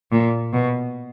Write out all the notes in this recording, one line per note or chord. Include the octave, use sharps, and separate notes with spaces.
A#2
B2